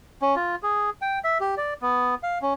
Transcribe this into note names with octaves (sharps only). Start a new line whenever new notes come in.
C#4
F4
G#4
G5
E5
G4
D5
B3
F5
C#4